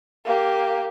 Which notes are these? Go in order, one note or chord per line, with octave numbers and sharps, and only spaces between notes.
A#3 G4